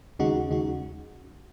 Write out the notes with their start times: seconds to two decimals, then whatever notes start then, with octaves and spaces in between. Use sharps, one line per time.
0.19 D#2 C#3 G#3 D#4 F#4
0.50 D#2 C#3 G#3 D#4 F#4